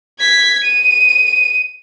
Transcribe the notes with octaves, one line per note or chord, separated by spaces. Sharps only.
G#6 B6
D#7